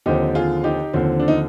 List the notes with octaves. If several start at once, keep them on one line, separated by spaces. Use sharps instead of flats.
D#2 D3 F3 C4 D#4 G4
F4 G#4
D#4 G4
D#2 D3 F3 C4
D4
D#4